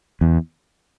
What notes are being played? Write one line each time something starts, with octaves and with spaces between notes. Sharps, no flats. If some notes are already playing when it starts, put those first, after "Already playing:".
E2